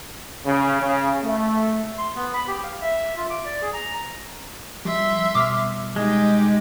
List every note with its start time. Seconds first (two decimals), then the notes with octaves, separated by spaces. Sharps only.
0.45 C#3
0.80 C#3
1.22 A3
1.98 C6
2.16 B3
2.34 B5
2.47 G4
2.63 F5
2.82 E5
3.17 F4
3.30 D6
3.45 D5
3.62 G#4
3.73 A#5
4.85 F3 G3 E5 C6
5.35 B2 G3 D6 F6
5.96 G#3 D#4 G4